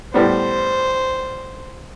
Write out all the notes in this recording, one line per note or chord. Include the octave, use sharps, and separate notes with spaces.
A2 G3 B3 C5